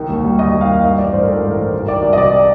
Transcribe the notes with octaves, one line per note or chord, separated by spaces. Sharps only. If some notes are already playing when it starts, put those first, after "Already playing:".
Already playing: C2 D#3
D#2
G3
D#2 D#5
D#2
F5
D#3
G2 D#5
A1 D5
G2 C5
A#4
A1 A4
A1
A#4
D#3
C2
D#3 D5
C2
D#5
C3 D5